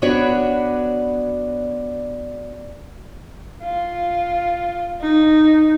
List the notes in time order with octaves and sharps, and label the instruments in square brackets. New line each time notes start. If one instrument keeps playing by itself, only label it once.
[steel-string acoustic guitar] B3 D4 F#4 B4 C#5 D5
[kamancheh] F4
D#4